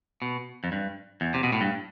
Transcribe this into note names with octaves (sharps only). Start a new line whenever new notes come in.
B2
F2
G2
E2
C3
B2
A2
G2